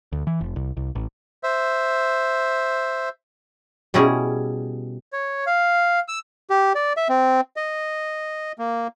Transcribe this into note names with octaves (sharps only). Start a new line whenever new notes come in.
D2
E3
F1
C2
C2
A1
C5 E5
B2 G3 C#4 E4 G#4
C#5
F5
E6
G4
D5
E5
C4
D#5
A#3